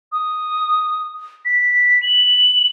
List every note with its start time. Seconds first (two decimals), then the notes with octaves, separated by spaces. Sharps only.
0.12 D#6
1.45 B6
2.03 F#7